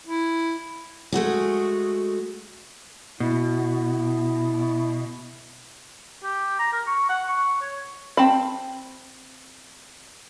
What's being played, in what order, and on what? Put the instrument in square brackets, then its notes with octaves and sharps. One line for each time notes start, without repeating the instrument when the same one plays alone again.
[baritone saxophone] E4
[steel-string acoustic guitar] G#3 A3 F#4 G#4
[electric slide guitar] B2 [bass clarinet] E4
[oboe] G4
A#5
A#4
C#6
F#5
C#6
C#5
[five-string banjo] C4 A5 B5